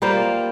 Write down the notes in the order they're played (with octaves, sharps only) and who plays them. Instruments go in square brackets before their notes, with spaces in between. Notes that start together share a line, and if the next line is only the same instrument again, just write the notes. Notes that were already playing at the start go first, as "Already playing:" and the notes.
[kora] G3 A#3 F4 C5